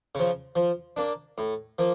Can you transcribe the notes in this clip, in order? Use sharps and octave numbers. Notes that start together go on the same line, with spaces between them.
C#3 F3
F3
A#3 D4
A2
F3 A#3